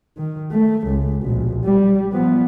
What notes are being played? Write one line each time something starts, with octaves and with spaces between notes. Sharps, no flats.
D#3
A3
C#2
A#1 B2
G3
F3 B3